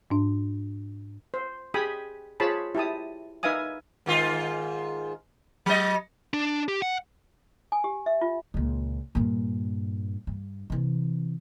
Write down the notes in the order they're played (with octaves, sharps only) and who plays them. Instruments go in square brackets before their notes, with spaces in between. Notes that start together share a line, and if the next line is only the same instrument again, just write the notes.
[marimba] G#2 D4
[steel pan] C5
G4 G#4 G5 G#5 B5 D#6
F4 G#4 C5 C#5 A5 B5
E4 G4 A5 D#6
D#4 B4 E5 F5 G#5 D#6
[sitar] G#2 D#3 F4
F#3 D#5
[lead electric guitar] D4
G4
F#5
[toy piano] G#5
G4
E5
F4
[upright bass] C#2 A#2
G2 A#2
G2
C3 E3